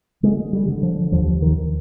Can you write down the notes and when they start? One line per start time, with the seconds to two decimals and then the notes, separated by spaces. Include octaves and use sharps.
0.23 D3 G#3
0.53 G3
0.68 D3
0.83 F3
1.12 D#2 F3
1.42 D#3